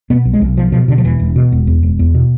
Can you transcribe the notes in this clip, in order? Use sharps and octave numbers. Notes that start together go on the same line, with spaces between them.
B2 B3
B1
G#3
B1
B2 F3
B2 F3
B2 D3
F3
E1 E3
E1
B2
E1
E2
E1
E2
B2